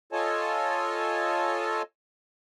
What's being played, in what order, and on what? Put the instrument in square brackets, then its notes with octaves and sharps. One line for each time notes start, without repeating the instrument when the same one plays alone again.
[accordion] F4 A4 C#5 D#5 G#5 A5